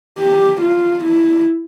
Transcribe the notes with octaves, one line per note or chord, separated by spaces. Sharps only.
G4
F4
E4